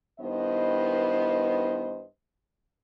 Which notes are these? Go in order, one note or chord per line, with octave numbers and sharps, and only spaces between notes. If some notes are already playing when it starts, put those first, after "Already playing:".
G2 D#3 B3 E4 C5 D#5